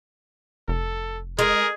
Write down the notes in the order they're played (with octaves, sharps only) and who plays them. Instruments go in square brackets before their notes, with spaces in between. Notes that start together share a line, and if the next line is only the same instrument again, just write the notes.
[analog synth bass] F1 [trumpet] A4
[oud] G#3 [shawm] G#4 [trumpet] A#4